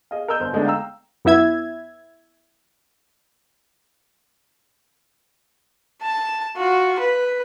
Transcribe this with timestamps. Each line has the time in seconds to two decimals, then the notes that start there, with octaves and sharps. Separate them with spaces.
0.11 G#4 D#5 F5
0.28 A#4 D#5 E6 G6
0.40 G1 C5
0.53 D3 G#3 A3 B3 D4 D#4
0.65 F5 G5 A#5 E6
1.25 F#2 B3 E4 E5 G#6
6.02 A5
6.57 F4 F#4
7.00 B4